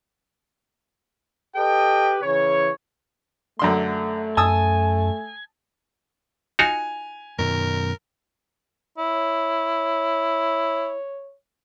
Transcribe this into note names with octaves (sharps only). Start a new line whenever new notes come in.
G4 A4 B4 D#5 G5
C#3 E3 C#5
F#2 D3 A3 C6
F#2 G#5 A5 D#6 E6
D#4 F4 F#4 G#5 F7
F#2 B2 D#3 A#4
E4 C#5